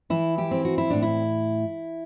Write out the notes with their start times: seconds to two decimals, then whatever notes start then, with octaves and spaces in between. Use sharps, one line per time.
0.10 E3 E4
0.38 E4 G4
0.51 C4
0.65 F#4
0.78 E4
0.90 A2 D4
1.02 E4